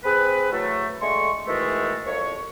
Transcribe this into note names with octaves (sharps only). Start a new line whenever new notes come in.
C4 G#4 B4
E3 F#3 A3
D3 G#3 A3 C6 C#6
G#2 B2 D#3 E3 G#3 A3
C2 F2 C#5 C#6